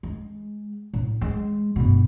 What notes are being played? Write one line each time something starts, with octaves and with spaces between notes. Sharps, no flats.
G#3
A2
G#3
G1 B2